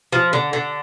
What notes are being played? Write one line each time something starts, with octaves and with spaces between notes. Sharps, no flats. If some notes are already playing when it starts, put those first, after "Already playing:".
F3
D3
D3